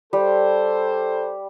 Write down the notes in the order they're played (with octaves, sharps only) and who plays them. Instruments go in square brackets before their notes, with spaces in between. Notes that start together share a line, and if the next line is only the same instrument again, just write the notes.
[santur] G3 [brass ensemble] A4 C5